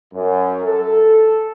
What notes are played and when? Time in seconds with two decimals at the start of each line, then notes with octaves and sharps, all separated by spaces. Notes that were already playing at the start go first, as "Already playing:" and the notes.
0.13 F#2
0.63 A4